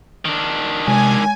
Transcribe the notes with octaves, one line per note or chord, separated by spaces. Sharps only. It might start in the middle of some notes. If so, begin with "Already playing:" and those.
D#3 D4
C3 G#3 G#5